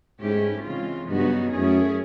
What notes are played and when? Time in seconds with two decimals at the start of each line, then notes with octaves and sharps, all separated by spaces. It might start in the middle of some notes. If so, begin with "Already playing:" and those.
0.20 G#2 A3 C#4 E4 G4
0.65 C#3 E3 G#3 C4 F4
1.09 G2 C#3 F#3 B3 D#4 F#4
1.53 F#2 A3 C#4 E4 G#4